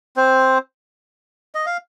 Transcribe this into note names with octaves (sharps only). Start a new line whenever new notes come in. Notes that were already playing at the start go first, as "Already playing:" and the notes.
C4 C5
D#5
F5